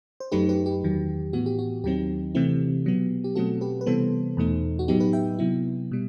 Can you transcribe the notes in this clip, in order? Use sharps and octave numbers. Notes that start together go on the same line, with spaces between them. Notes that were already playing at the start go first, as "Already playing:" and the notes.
C5
F#2 F#3 A3 D#4 G4 B4
G4 B4
G4
E2 D#3 F#3
A2 E3 B3 F#4
G4
F#4
D#2 D#3 F#3 C4 D#4 G4
C3 E3 A3 C4 E4
B2 F#3 B3
G4
B2 F#3 A3 C4 F#4 A4
G4 B4
B4
C3 E3 G3 B3 A4 C5
E2 B2 A3 D#4
F#4
A2 F#3 B3 D#4 G4
G4 B4
E5 G5
C3 F#3 B3 E4
B2 G3